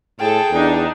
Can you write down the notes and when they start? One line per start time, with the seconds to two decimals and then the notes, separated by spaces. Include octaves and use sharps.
0.20 A2 G#4 A4 G5 A5
0.51 E2 D4 D#4